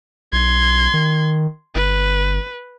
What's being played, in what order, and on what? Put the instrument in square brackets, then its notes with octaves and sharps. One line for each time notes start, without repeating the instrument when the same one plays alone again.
[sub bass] B1 [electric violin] C6 G#6
[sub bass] D#3
[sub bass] G1 [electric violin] B4